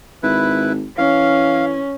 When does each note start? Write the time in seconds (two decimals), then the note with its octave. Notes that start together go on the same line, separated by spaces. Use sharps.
0.23 G#1 E4 B4
0.98 E3 C#4 F5